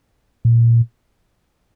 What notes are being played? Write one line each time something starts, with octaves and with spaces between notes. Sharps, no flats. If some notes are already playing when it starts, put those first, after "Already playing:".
A#2